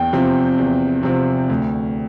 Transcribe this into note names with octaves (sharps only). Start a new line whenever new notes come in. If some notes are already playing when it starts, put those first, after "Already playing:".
Already playing: E2 G5
C3 F3 C4
E2
C3 F3 C4
D2